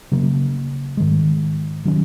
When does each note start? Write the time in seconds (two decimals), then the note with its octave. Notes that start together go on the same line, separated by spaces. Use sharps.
0.12 C#3 F#3 A#3
0.97 G#2 D#3 G#3
1.85 D#3 F#3 C#4